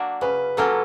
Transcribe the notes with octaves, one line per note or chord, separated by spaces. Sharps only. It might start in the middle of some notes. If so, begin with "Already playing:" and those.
Already playing: F#3 A#3 D4 F#4
C#3 B4
F#3 A#3 C#4 F4 A4